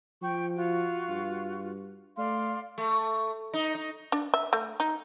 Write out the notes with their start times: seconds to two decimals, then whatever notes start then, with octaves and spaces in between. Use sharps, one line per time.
0.22 F3 G5 C#6
0.55 F4 F#4
1.08 G2
2.17 A3 D5 F5 C6
2.78 A3
3.54 D#4
3.75 D#4
4.12 D4
4.34 E5
4.53 A3
4.80 D#4